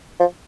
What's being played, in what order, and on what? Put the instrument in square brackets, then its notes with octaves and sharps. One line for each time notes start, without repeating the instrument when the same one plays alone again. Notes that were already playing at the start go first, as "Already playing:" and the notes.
[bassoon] F3